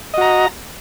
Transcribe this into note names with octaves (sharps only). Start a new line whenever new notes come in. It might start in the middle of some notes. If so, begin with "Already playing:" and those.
F#4 D#5 A#5